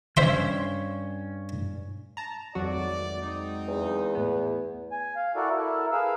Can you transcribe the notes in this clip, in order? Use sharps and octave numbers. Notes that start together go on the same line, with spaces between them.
G2 C#4 C5 E5 C6
A5 A#5
G#1 F2 F#3 A3 F#4 D5
G#3 C4 D#4
E2
A2 B3
G#5
F5
E4 F#4 A4 A#4 D5
E4 A4 A#4
G#4 A#4 B4 F5 E6